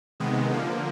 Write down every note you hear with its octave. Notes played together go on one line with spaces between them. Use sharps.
C3 D#3 G#3 B3
D3 F3 A#3